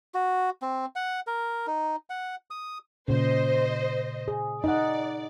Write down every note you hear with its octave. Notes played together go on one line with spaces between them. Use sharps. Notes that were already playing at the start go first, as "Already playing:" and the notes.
F#4
C4
F#5
A#4
D#4
F#5
D#6
A#2 C#3 C5 D#5
G#4
D#4 D5 D#5 F#5